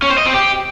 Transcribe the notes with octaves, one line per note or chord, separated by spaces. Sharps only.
C#4
C5
D#5
C4
G4